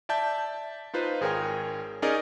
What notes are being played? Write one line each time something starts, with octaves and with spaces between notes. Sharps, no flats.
D5 E5 A5 G6
D#4 F4 B4 C5
G#1 G#4 A#4 C#5 G5
C#4 D#4 G#4 A#4 D5 D#5